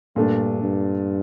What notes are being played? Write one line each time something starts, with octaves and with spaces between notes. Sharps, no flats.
G2 A#2 A3 D4
G2